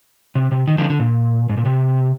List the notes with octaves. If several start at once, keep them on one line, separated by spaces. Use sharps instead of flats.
C3
C3
D#3
D3 F3
D3
A#2
G#2
A#2
C3